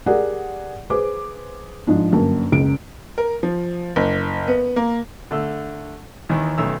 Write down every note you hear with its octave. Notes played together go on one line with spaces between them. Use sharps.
G4 G#4 A#4 D5 F#5
G#4 B4 C5 D6
G#2 F3 D4
G1 F#2 A#3 A5
F#1 C#2 D7
A#4
F3
F#1
B3
A#3
D3 A3 E6
D#2 D#3 E3
B1 D#3 A3 C#4 A#5 E6